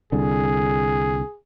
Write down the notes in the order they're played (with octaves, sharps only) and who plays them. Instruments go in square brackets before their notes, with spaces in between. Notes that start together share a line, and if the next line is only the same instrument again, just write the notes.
[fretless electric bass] C2 D3 [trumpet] G#4